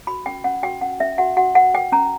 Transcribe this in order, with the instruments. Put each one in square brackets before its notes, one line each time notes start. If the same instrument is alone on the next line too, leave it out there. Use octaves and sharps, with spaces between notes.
[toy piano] F#4 B5
C#4 G5
C#4 F#5
F#4 G5
C#4 F#5
C#4 E5
F#4 F#5
F#4 F#5
B4 F#5
B4 G5
C#4 A#5